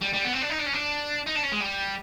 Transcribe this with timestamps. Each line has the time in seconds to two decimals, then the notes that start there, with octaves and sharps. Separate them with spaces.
0.02 G3
0.14 G3
0.24 B3
0.33 C4
0.42 D4
0.50 D#4
0.59 D4
0.66 C#4
0.73 D4
1.27 D#4
1.36 D4
1.43 C#4
1.52 G#3
1.61 G3